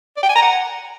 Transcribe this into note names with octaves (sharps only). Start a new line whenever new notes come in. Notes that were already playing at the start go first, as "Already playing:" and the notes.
D5
G5
G#5
A#5
F#5